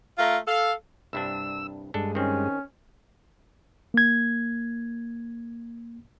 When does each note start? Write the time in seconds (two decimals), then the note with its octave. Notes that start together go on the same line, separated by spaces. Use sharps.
0.18 A3 F4 A#4
0.47 A4 F5
1.13 C2 G2 D4 E6
1.94 G2 G#3 D4 A4
2.15 D#3 C4 C#4
3.94 A#3 G#6